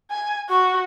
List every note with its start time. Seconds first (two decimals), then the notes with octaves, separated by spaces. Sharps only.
0.11 G#5
0.49 F#4 C#6